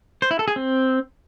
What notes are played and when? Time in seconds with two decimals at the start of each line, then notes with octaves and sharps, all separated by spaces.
0.22 C5
0.31 E4
0.39 A4
0.48 G#4
0.56 C4